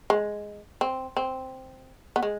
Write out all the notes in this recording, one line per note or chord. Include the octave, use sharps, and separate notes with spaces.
G#3
C4
C4
B3
G#3